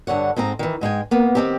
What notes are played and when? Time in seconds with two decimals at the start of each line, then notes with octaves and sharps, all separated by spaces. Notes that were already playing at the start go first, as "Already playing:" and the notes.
0.07 G2 D3 C#5 F#5
0.36 G#2 C4 D#5 A#5
0.59 D#3 E3
0.81 G#2 G#3 G5 G#5
1.11 A#3 B3
1.35 D#3 C4 G4